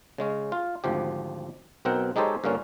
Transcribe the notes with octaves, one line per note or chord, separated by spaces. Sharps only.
C#3 G#3 C#4
F4
G#1 D2 F3 G4
B1 B2 C4 A#4 F#5 G5
G#3 D#4 G4 A4 C5 C#5
G2 D3 A#3 C#4 F4